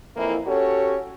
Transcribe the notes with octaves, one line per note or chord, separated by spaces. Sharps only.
F2 E3 A#3 E4
C#4 F#4 G4 A4 C#5